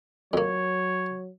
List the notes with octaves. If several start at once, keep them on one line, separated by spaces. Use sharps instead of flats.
F2 F#3 A#3 C#5